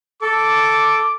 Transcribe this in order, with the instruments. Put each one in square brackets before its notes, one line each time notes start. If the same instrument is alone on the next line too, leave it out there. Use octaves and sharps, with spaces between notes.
[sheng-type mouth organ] A4 [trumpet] D6